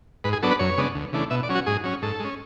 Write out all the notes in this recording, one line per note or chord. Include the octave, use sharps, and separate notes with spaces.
G#2 B4
G#4
F#3 B3 D4 A4
B4
F#2 C#5
C#3 G#3 B3 D4
D2
C#3 E3 A3 D4
B2 E5
D5
F#3 C#4
F#4
G#2 G#4
F#3 C#4
G#2 A4
G#3 C#4